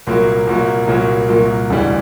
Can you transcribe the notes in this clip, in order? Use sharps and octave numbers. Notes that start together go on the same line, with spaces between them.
C2 A#2 F#3 A#3
C2 A#2 F#3 A#3
C2 A#2 F#3 A#3
C2 A#2 F#3 A#3
E1 D2 C#3 E3 G3